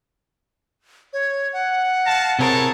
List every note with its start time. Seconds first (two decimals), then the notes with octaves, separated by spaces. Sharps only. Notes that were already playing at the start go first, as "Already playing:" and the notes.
1.13 C#5
1.53 F#5
2.05 F5 A5 A#6
2.39 C3 C4 E4 G#4 A#4 C#5 A5